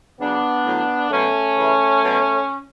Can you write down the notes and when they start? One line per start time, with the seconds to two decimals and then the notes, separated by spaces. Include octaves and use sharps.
0.20 C#3 F#3 B3 D4
0.65 A2 F#3
1.11 B2 F#3 A3 C#4
1.57 C#3 E3
2.02 B2 F#3